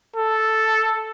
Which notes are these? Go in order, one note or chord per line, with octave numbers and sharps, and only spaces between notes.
A4